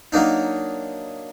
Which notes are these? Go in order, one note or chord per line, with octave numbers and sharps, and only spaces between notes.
F#3 A#3 D4 D#4